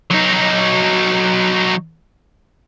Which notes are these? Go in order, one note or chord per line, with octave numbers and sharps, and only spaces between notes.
F#3 D#4